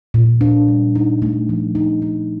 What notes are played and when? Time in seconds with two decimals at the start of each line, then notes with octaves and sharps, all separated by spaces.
0.14 A#2
0.41 D4
0.68 G3
0.95 D#4
1.22 A3
1.49 F3
1.75 D#4
2.02 D#4